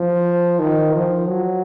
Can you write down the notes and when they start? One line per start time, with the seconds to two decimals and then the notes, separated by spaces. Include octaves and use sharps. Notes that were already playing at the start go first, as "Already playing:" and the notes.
Already playing: F3
0.59 D#3
0.95 F3
1.28 F#3